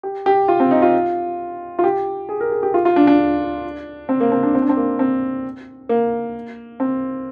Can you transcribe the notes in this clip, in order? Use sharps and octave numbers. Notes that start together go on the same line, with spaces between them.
G4
G4
F4
C4
D#4
F4
F4
G4
G#4
A#4
G#4
G4
F4
F4
D4
D4
C4
A#3
C4
D4
C4
D4
C4
A#3
C4
A#3
C4